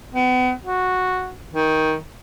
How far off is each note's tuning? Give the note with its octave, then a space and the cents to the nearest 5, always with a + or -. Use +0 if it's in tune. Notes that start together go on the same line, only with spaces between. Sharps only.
B3 +35
F#4 -5
D#3 +15